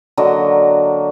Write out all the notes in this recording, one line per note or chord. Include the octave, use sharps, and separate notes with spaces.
D3 F#3 A#3 D#5